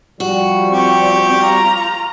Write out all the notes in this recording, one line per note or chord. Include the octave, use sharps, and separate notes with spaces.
F3 G3 F#4
C4 G4 C#6
F4 A#5